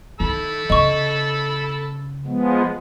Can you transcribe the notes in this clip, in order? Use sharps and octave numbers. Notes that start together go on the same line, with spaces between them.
D#3 A4 B5 E6
C#3 D#5 C#6
F3 G#3 B3